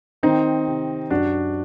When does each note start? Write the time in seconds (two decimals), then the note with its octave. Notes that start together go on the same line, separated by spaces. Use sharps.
0.23 D#3 C4 D#4
0.67 C3
1.10 F#2 D4 F#4